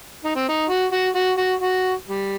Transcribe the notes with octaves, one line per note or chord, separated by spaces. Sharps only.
D#4
C4
D#4
F#4
F#4
F#4
F#4
F#4
G3